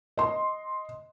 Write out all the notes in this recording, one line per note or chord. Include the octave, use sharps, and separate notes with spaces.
D#5 C6